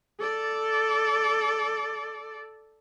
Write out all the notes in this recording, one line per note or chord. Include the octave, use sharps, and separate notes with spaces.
A4 D5